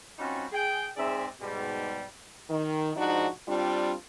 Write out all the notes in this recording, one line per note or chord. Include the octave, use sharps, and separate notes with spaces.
G3 C4 C#4 D#4 F4 F#4
G#4 G5
G#2 C4 G#4 D5 E5
G#2 B2 G3
D#3
G#2 F3 D4 D#4 F#4
G3 C4 D4 F4